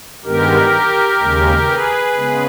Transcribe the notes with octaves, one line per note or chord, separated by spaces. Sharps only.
G2 D#3 G#3 B3 G4 A#4
D#2 C#3 G#3
G#4 B4
C#3 G#3 B3